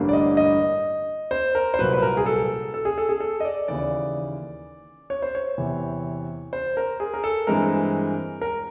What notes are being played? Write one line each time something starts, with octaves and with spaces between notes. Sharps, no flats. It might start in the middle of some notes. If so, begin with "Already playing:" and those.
Already playing: A1 G2 D3 G3 A#3
D5
D#5
D#5
C5
A#4
C5
C2 A#2 F#3 B4
B4
A#4
G#4
A4
A4
G#4
A4
G#4
A4
D#5
D5
D#2 C#3 E3 D5
C#5
C5
C#5
E2 C3 E3
C5
A#4
G#4
A#4
A4
G2 E3 G#3 C4 A#4
A#4